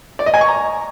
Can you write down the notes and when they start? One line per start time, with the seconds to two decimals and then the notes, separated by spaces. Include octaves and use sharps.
0.19 D5
0.26 D#5
0.34 G#5
0.41 C#6
0.48 A#5